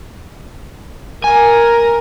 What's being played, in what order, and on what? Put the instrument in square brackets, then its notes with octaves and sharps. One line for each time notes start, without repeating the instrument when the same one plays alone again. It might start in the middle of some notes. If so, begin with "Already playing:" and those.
[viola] A#4 [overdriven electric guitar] G#5